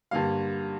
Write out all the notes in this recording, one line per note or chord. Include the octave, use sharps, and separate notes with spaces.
G2 D3 G3 A#3 F5